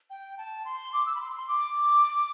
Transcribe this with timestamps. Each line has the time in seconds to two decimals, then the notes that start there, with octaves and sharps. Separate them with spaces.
0.10 G5
0.38 A5
0.65 C6
0.93 D6
1.06 E6
1.15 B5
1.21 C6
1.34 C6
1.48 D6